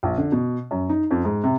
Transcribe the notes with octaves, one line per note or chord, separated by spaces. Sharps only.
A#1
D3
B2
F#2
D#4
F2
G#2
C3